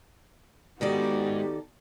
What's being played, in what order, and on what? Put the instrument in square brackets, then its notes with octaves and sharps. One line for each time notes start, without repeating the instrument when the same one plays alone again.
[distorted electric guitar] G#2 [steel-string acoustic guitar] D#3 A4 D5 [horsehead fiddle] B3 F#4 [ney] G4